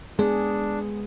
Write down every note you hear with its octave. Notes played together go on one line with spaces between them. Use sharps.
G#3 B3 D4 G#4